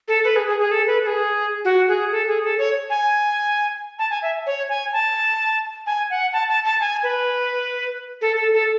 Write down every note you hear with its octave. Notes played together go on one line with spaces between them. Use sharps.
A4
B4
G#4
G#4
G#4
A4
B4
A4
G#4
F#4
G#4
A4
G#4
A4
C#5
G#5
A5
G#5
E5
C#5
G#5
A5
G#5
F#5
A5
A5
A5
G#5
B4
A4
A4
A4